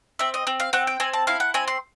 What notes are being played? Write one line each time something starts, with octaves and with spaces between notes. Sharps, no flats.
C4 E5
D#5
C4
F5
C4 F#5
G5
C4 G#5
A5
E4 F5
F#5
C4 G#5
C6